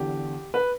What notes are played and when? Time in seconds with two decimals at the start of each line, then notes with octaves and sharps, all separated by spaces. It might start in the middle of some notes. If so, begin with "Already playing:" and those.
Already playing: E2 D3 G4
0.54 B4